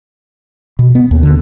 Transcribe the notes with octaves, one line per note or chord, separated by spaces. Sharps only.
B2
B3
D#2
D3